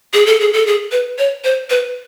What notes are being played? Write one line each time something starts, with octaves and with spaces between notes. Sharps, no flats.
G#4
A4
G#4
A4
G#4
B4
C#5
C5
B4